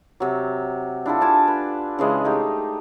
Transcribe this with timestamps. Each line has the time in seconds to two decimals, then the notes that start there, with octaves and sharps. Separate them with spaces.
0.20 C3 F#3
1.06 D4 E4 F4 A4
1.21 F4 G#5 A5 D6
1.48 B4
1.99 C#3 E3 G#3 D#5
2.24 A3 D#4 G4